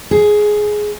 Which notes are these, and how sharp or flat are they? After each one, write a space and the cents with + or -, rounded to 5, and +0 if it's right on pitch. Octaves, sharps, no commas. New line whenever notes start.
G#4 +10